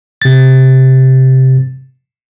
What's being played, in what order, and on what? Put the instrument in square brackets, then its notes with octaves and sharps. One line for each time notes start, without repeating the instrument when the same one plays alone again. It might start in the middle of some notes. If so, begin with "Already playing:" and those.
[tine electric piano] C3 A6